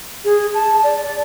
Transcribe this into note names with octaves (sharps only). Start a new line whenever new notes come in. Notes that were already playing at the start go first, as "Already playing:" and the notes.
G#4
A5
D5
D5